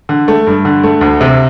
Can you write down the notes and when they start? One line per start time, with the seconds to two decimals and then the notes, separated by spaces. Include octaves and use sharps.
0.09 D3
0.28 A3
0.47 G2
0.65 D3
0.83 A3
1.01 D2
1.21 C3